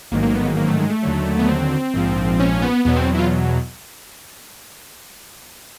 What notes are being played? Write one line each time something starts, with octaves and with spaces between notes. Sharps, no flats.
A1 G#2 D#3 F#3 A#3
A#3
B3
A#3
A#3
A3
G#3
A3
D#2 D3 F#3
B3
C4
A#1 G#2 F3
C#4
B3
E2 B2 F#3 B3
C4
E4
F4